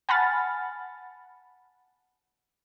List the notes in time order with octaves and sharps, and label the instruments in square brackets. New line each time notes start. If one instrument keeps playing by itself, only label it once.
[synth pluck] F#5 G#5 A5 B5 F6 A6